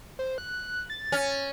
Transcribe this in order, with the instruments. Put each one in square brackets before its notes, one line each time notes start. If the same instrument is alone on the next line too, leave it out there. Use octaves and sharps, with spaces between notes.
[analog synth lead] C5
F#6
A6
[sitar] C#4